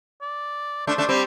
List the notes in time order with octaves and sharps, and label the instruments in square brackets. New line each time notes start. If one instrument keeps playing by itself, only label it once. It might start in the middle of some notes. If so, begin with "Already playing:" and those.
[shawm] D5
[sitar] A3 D4 [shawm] C5
[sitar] A3 D4
G3 C4